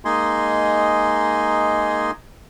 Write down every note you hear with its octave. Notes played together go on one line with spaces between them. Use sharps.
G#3 A#3 D#4 D#5 G#5 C6